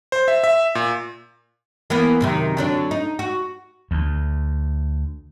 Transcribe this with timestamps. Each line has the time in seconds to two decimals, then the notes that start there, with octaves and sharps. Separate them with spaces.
0.12 C5
0.28 E5
0.44 E5
0.75 A#2
1.90 E3 A#3 B3
2.21 F#2 C3 D#3
2.57 D3 F#3 D4
2.91 D#4
3.19 F#4
3.91 D2